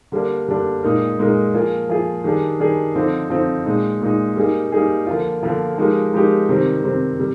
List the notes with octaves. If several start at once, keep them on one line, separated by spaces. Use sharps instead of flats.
D3 G3 A#3 D4
D3 G3 A#3 D4
A#2 G#3 D#4 A#4
A#2 G#3 D#4 A#4
F3 A#3 F4 G#4
F3 A#3 F4 G#4
D#3 G3 D4 G#4
D#3 G3 D4 G#4
D3 F3 C4 D#4
D3 F3 C4 D#4
A#2 G#3 D#4
A#2 G#3 D#4
G3 A#3 D#4 G#4
G3 A#3 D#4 G#4
D3 F3 A#3 F4
D3 F3 A#3 F4
F3 G#3 D#4 G4 A#4
F3 G#3 D#4 G4 A#4
C3 D#3 G3 C4
C3 D#3 G3 C4
C3 G3